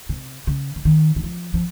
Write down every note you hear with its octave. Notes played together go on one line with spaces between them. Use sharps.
C3
C#3
C#3
D#3
D#3
F3
F3